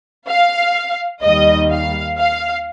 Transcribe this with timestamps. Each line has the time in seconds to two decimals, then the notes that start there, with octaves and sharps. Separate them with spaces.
0.28 F5
1.23 D#2 D#3 G3 D#5
1.71 F5
2.18 F5